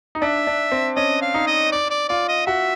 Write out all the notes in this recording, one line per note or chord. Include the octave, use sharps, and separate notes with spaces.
D#4
D4 E5
D4
C4
C#4 D#5
F5
D#4
D#5
D5
D5
F4 D5
D#5
F#4 E5